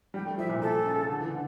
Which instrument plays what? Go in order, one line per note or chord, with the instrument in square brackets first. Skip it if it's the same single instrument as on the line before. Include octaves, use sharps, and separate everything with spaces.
[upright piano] G3 [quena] G5
[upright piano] A3
[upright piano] F3 [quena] E5
[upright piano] A#2
[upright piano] A#2 [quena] A4
[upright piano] C#3
D3
E3
D3